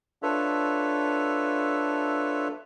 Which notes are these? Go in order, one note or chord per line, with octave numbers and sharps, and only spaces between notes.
D4 F4 A4 B4 C#5 E5